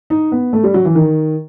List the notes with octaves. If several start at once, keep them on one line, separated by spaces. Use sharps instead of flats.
D#4
B3
A3
G3
F#3
E3
D#3